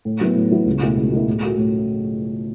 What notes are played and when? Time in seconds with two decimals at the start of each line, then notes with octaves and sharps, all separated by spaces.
0.05 A2
0.21 F#3 B3 E4
0.36 A2
0.51 F#3 B3 E4
0.66 C#2
0.81 B2 A3 E4
0.97 C#2
1.12 B2 A3 E4
1.27 A2
1.42 A3 F#4
1.58 A2